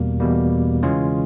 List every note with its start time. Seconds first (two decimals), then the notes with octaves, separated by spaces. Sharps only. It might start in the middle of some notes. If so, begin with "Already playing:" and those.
Already playing: E2 B2 G3 A#3
0.20 E2 B2 G3 A#3
0.83 C#3 E3 G#3 C#4 F4